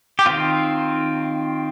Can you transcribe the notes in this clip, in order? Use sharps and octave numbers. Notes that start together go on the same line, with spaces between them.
G4
D#3 C4 F4